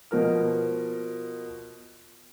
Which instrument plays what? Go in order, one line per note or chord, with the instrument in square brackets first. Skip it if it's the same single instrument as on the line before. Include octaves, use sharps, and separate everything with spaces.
[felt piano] B2 F3 A#4 F6